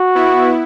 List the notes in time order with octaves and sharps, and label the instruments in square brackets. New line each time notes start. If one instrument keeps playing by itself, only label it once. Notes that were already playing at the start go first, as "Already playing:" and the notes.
Already playing: [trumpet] F#4
[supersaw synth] B3 E4